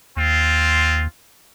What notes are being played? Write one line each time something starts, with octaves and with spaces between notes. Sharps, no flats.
D#2 C4 F4